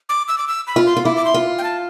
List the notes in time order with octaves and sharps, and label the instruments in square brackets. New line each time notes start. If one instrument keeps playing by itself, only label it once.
[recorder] D6
E6
D6
E6
B5
[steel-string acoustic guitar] F4
[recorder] C6
[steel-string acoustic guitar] F4
[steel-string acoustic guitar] E4 [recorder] D6
[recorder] D6
C6
[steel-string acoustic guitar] F4
[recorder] G5
A5